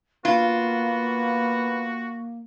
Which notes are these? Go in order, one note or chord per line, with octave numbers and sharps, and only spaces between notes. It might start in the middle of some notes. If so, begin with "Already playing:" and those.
A#3 B3 F4 F#4